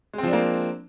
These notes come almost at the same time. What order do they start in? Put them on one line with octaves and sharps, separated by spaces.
G#3 C4 F3 D4 A#3